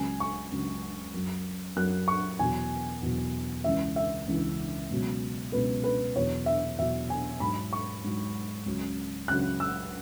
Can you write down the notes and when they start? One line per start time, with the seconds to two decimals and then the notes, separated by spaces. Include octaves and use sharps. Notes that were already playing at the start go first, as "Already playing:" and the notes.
Already playing: C#2 C#3 F#3 G#5
0.20 C#6
0.52 C#2 C#3 F#3
1.14 F#2 F#3
1.76 F#2 F#3 F#6
2.08 C#6
2.39 E2 B2 F#3 G#5
3.03 E2 B2 F#3
3.64 C#2 C#3 E3 E5
3.96 E5
4.27 C#2 C#3 E3
4.91 C#2 B2 F#3
5.52 C#2 B2 F#3 B4
5.84 B4
6.16 E2 B2 F#3 C#5
6.46 E5
6.78 E2 B2 F#3 E5
7.10 G#5
7.40 G#2 F#3 B5
7.73 C#6
8.04 G#2 F#3
8.66 C#2 C#3 F#3
9.28 C#2 C#3 F#3 F#6
9.60 E6